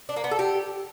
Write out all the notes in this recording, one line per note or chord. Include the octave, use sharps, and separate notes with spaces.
D4
A#3
B3
A4
G4